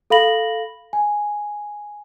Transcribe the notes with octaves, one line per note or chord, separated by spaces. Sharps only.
A4 F5 B5 A#6 F#7
G#5